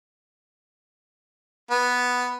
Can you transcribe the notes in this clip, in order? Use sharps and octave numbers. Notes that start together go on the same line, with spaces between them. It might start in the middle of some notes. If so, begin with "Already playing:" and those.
B3